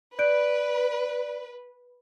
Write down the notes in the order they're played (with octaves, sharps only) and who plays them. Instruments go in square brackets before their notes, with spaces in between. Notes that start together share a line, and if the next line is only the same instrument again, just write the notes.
[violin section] B4 [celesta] D5 F#6 D7